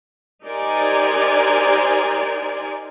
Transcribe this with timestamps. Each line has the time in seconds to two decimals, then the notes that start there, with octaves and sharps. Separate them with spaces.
0.44 D#4 G4 A#4 C5 D5 G#5